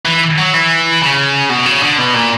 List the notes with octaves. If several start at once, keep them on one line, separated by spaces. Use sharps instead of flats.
E3
F#3
E3
C#3
B2
C#3
D3
B2
A#2